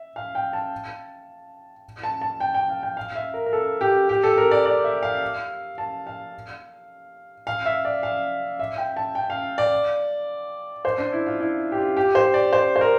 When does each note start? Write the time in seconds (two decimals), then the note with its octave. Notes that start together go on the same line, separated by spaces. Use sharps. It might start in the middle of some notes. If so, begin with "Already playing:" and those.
Already playing: E5
0.16 F5
0.35 G5
0.53 A5
2.03 A5
2.21 A5
2.40 G5
2.54 G5
2.69 F5
2.83 G5
2.97 F5
3.15 E5
3.34 A#4
3.46 A#4
3.53 A4
3.81 G4
4.09 G4
4.23 A4
4.38 A#4
4.51 D5
4.65 D5
4.84 E5
5.03 F5
5.78 A5
6.07 F5
7.47 F5
7.66 E5
7.85 D5
8.03 F5
8.59 E5
8.78 G5
8.96 A5
9.15 G5
9.30 F5
9.58 D5
10.85 C5
10.98 D4
11.12 E4
11.26 F4
11.40 E4
11.72 G4
11.78 F4
11.97 G4
12.15 C5
12.34 D5
12.53 C5
12.76 C5
12.81 A#4